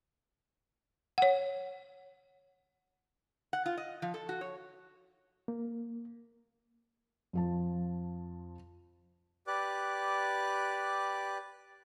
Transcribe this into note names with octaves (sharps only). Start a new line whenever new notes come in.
C#5 F#5
F#5
F4
D#5
F3
A4
F#4
C#5
A#3
F2 F3 A5
G4 B4 D5 D6 F#6